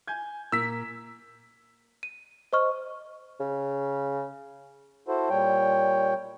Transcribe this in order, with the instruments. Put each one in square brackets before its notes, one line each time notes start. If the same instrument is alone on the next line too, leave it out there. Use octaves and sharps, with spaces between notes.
[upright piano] G#5 G6 G#6
[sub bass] A#2 [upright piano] A#3 [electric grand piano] E6 B6
[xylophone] D#7
C5 D#5 C#6 F6
[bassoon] C#3
[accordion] E4 F#4 A4 C5
A#2 G3 C#5 G5